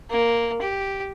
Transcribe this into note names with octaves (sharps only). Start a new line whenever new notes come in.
A#3
G4